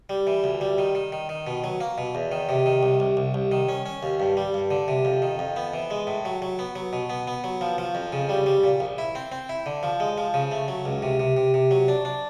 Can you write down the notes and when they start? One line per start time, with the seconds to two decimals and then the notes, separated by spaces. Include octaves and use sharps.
0.09 G3
0.27 E3
0.44 D2
0.61 G3
0.78 D#3
0.95 D#3
1.12 D#3
1.29 D#3
1.47 B2
1.64 F#3
1.81 A#3
1.98 B2
2.15 E2
2.32 D#3
2.49 C3
2.66 D#3
2.83 C2
3.00 C2
3.17 C2
3.34 C2
3.52 D#3
3.69 C#4
3.86 C#4
4.03 D#2
4.20 G2
4.37 G3
4.54 G2
4.71 D3
4.88 C3
5.05 F2
5.22 D#3
5.39 F2
5.56 B3
5.74 E3
5.91 G#3
6.07 A2
6.25 F#3
6.42 F#3
6.59 B3
6.76 F#3
6.93 B2
7.10 B3
7.27 B3
7.44 F#3
7.61 F3
7.78 F3
7.95 F2
8.12 C#3
8.29 G3
8.46 G3
8.64 A#2
8.80 A#1
8.98 E4
9.15 C4
9.32 C4
9.49 E4
9.66 D3
9.83 F3
10.00 G#3
10.18 F3
10.34 C#3
10.52 A3
10.68 F#3
10.85 C#2
11.02 C3
11.20 C3
11.37 C3
11.54 C3
11.71 F#3
11.88 D4
12.05 D4